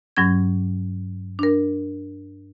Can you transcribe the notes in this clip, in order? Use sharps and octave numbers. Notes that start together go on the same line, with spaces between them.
G2 F#3 C#4 G#6
D4 A#4